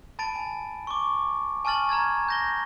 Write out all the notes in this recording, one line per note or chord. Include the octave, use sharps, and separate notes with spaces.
A5 B5 A6 D7
G#5
C#6 D6
G#5 A5 C#6 F6 A6 F#7
A#5 F6 G#6 A6
G6 A#6 G7